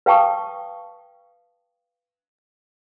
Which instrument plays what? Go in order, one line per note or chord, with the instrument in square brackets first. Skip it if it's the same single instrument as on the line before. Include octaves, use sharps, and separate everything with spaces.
[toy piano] B4 F5 G5 A5 C#6 D#6